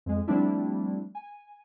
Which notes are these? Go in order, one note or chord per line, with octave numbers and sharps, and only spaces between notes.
F2 G#3
F3 G3 A3 C4 D4 E4
G#5